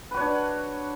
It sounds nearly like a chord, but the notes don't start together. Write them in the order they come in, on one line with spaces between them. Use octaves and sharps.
B4 F#4 C#5 D4